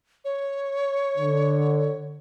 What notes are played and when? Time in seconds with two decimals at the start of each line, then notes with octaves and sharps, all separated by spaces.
0.25 C#5
1.17 D3